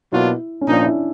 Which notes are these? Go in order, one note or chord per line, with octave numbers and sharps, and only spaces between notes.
B2 F#3 A#3 D4 E4 F4
C#4
A#2 F3 A#3 D4 D#4
E4